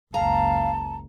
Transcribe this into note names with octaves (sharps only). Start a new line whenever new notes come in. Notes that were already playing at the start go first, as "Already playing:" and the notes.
F#1 C#2 F5 A5 A#5